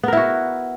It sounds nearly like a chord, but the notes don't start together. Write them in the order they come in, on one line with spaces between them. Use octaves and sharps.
B3 A#4 E4 F#4